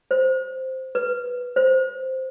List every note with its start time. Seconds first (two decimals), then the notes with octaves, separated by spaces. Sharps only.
0.11 C5
0.95 B4
1.56 C5